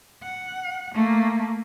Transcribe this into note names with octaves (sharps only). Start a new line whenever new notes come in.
F#5
A3 A#3